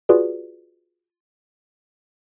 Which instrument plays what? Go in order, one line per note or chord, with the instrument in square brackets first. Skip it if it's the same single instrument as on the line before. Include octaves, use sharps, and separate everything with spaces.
[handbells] F4 F#4 G#4 B4 D5